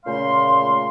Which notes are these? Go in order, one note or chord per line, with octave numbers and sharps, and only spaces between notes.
A#2 C#3 A3 F5 C6